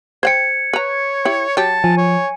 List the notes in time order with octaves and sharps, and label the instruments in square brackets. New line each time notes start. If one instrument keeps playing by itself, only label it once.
[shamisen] C5 F#5 G5 [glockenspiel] G#6 C#7
[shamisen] B4 A#5 [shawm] C#5
[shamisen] E4 G4
[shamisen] F#3 G4 [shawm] A5
[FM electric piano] F3 [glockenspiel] G#5
[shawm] C#5